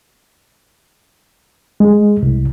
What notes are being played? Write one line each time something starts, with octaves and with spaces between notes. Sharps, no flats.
G#3
C2